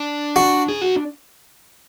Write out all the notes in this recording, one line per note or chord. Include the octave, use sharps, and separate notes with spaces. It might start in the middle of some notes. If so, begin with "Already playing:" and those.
Already playing: D4
F#4
G#4
F#4